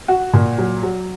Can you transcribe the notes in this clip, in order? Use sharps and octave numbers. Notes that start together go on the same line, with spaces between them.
F#4
A#2
F#3
F#3